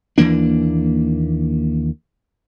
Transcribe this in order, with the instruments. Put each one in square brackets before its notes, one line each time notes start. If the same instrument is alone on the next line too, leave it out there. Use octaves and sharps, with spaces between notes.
[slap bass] D#2 E3 A#3 D4